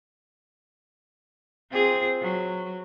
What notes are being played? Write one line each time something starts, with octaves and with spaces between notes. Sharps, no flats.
C4 F4 G#4
F#3